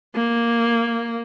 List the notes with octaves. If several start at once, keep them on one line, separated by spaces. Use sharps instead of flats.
A#3